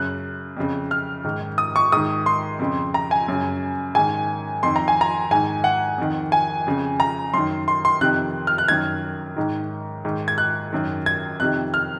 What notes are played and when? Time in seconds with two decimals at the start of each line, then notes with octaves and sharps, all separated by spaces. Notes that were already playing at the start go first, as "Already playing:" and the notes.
Already playing: F#2 C#3 F#6
0.57 F2 C#3
0.91 F6
1.24 G#2 D#3
1.58 D#6
1.76 C#6
1.92 G#2 D#3 D#6
2.26 C6
2.59 F2 C#3
2.94 A#5
3.11 G#5
3.28 F#2 C#3
3.95 G#2 D#3 G#5
4.63 F2 D#3 C6
4.76 A#5
4.88 G#5
5.01 A#5
5.31 G#2 D#3 G#5
5.64 F#5
5.98 F2 D#3
6.32 G#5
6.67 F2 C#3
7.00 A#5
7.34 F#2 D#3 C6
7.68 C6
7.85 C6
8.01 F2 C3 D#3 F#6
8.47 F6
8.58 F#6
8.68 F#2 D#3 G#6
9.36 G#2 D#3
10.05 G#2 D#3
10.28 G#6
10.38 F#6
10.73 F#2 D#3
11.06 G#6
11.40 F2 C3 D#3 F#6
11.74 F6